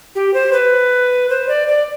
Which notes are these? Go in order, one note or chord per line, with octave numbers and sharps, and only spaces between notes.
G4
C5
B4
C5
D5
D5